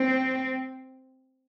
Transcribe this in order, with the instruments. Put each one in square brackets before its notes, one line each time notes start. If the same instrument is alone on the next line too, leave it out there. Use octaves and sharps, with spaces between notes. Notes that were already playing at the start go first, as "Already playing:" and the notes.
Already playing: [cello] C4